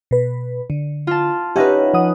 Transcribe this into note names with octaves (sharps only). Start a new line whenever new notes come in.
B2 B4
D3
F4 A5
C#4 D#4 G4 B4 E5 F#5
F3 F#5 D#6